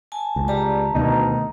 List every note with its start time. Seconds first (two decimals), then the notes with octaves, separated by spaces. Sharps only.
0.12 G#5 A5
0.36 C#2
0.48 G3 A5 A#5
0.95 D2 B2 D#3 D#4